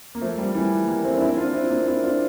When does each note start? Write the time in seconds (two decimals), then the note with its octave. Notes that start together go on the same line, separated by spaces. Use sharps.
0.15 A#3
0.21 F3 A3
0.38 G3 A#3
0.55 E3 G3
0.88 G3 A#3
1.04 A3 C4
1.17 D4
1.21 C4 E4
1.37 D4 F4
1.54 C4 E4
1.70 A#3 D4
1.87 C4 E4
2.04 D4 F4